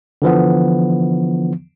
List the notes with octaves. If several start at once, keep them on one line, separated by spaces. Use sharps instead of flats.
D3 E3 F3 B3